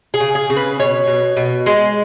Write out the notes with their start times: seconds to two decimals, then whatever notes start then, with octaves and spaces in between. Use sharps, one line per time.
0.14 G#4
0.20 C#3
0.35 G#4
0.50 C#3
0.57 B4
0.79 B2 C#5
1.07 B2
1.37 B2
1.66 G#3